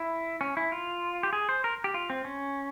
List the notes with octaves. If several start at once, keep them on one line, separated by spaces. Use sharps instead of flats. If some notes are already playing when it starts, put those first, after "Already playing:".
Already playing: E4
C#4
E4
F4
G4
G#4
C5
A#4
G4
F4
C4
C#4